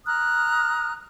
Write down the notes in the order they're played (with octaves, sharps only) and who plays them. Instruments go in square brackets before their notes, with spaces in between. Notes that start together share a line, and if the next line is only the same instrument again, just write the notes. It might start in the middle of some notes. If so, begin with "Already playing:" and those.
[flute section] A#5 D#6 F6 F#6